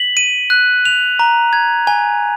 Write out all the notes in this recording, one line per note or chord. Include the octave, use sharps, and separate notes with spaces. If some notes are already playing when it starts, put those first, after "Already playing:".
Already playing: B6 F#7
D#7
F#6
F7
A#5
G#6
G#5